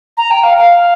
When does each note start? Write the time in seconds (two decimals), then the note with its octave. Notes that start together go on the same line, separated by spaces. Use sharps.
0.17 A#5
0.31 G5
0.43 F5
0.57 F5